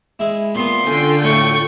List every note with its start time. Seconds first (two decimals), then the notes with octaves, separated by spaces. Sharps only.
0.19 G#3 E4
0.55 A#2 B3 C6
0.86 D3 C#4 F4 G5
1.24 A2 C#6